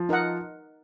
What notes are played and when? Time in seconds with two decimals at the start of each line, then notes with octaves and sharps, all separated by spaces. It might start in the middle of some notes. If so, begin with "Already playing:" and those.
Already playing: F3
0.09 D#4 A#4 D#5 F#5